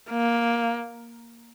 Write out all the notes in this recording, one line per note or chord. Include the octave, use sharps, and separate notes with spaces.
A#3